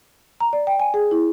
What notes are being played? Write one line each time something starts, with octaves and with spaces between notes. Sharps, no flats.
A#5
D5
G5
G#5
G#4
E4